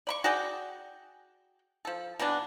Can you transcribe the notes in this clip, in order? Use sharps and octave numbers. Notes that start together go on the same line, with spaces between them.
D5 B5 C#6
F#4 G#4 D5 G5
F3 A4
B2 E3 B3 D4